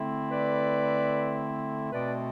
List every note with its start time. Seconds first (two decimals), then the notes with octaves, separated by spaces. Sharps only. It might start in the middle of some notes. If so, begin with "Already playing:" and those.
Already playing: D3 A3 C4 E4
0.30 B4 D5
1.91 B2 A3 C4 B4 D5